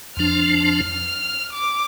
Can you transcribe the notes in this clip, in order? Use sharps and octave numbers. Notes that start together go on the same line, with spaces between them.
F2 F3 D4 F6
F6
D6